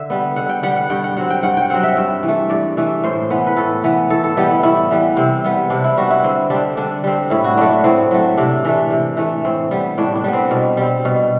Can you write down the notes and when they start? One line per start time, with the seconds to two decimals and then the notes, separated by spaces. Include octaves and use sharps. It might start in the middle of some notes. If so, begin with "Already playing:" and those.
Already playing: D3 E5
0.10 G3 B3
0.36 D3 F#5
0.49 G5
0.63 G3 B3 F#5
0.76 F#5
0.90 G2 G5
1.04 F#5
1.17 F#3 C4 F#5
1.30 G5
1.43 G2 F#5
1.57 G5
1.70 F#3 C4 F#5
1.83 E5
1.97 G2
2.23 E3
2.28 A3
2.50 G2 D5
2.77 E3 A3
3.04 A2 C5
3.30 E3 B3
3.47 B4
3.56 A2 A4
3.84 E3 B3
4.10 A2 A4
4.24 A4
4.37 E3 G3 B3 G4
4.50 E4
4.63 A2 E4
4.91 E3 G3 B3
5.17 C3 C4
5.44 G3 B3
5.70 C3 D4
5.84 E4
5.97 G3 B3 F#4
6.11 E4
6.24 D3 C4
6.50 G3 C4 D4
6.77 D3 D4
7.04 G3 C4
7.30 A2 E4
7.44 F#4
7.57 F#3 A3 D4
7.71 D4
7.84 A2 C4
8.11 F#3 A3
8.37 C3 D4
8.65 E3 A3 D4
8.91 C3
9.17 E3 A3
9.45 A2 C4
9.71 G3 B3
9.98 A2 D4
10.16 D4
10.24 G3 B3
10.33 C4
10.51 B2
10.77 G3 C4
11.05 B2